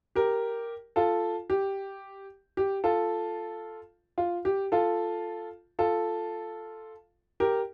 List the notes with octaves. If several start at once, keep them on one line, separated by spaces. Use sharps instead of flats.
G4 A#4
F4 A4
G4
G4
F4 A4
F4
G4
F4 A4
F4 A4
G4 A#4